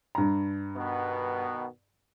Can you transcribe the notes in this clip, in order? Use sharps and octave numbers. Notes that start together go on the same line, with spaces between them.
G2 A#5
B2 D#3 B3